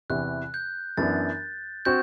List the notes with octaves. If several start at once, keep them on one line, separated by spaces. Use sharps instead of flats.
E2 C3 E3 F#6
G6
F#2 E3 B3 D4 A6
C4 F#4 G6